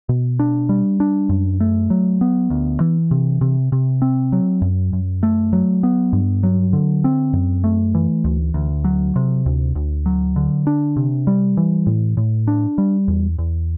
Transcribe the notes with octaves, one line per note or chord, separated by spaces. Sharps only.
B2
D4
G3
D4
F#2
A3
F#3
B3
D2
E3
C3
C3
C3
C4
F#3
F#2
F#2
A3
F#3
B3
G2
F#3
D3
C4
F#2
A3
E3
D2
D2
F#3
C3
D2
D2
F#3
D3
D4
C3
G3
E3
A2
A2
D4
G3
E2
E2